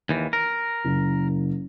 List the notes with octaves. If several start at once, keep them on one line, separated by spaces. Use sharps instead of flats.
D#2 E3
A#4
F#1